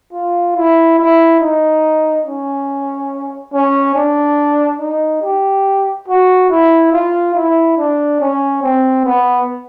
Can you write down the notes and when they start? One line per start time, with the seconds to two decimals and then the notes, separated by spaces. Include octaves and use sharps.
0.13 F4
0.56 E4
0.98 E4
1.40 D#4
2.26 C#4
3.53 C#4
3.95 D4
4.80 D#4
5.23 G4
6.08 F#4
6.51 E4
6.93 F4
7.35 E4
7.78 D4
8.20 C#4
8.62 C4
9.05 B3